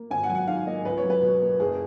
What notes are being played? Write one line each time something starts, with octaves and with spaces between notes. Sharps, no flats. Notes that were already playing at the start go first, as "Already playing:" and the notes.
Already playing: A#3
G#1 G#5
F#5
F#3 G#5
F#5
G#2 F5
A#3 D#5
C#2 B4
C#5
F#3
B4
B2
A#3
F#1 G#4